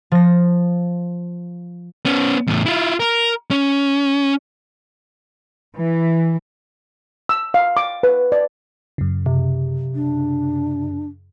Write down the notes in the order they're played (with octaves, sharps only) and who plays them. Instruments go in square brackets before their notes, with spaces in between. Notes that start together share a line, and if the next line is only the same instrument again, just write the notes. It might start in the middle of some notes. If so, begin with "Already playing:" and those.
[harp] F3 A#6
[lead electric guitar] B3 C#4
E2 A2
E4 F4
A#4
C#4
[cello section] E3
[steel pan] E6
F5
D6
B4
D5
[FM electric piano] F#2 C#3
[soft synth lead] C3
[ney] D4